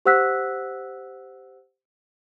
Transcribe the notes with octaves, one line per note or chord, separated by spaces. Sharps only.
G4 C5 F#5 E6 F#6 B6